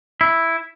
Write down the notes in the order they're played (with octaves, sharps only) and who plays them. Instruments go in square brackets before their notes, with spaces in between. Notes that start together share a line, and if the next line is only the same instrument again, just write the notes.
[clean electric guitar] E4